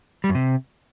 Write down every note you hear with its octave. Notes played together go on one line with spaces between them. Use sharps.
G3
F#2
C3